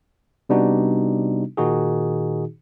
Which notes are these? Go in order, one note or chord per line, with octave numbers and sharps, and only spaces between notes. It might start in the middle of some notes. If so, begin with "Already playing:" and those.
C3 G3 B3 D4 D#4 F#4
A#2 D#3 D#4 F#4 G#4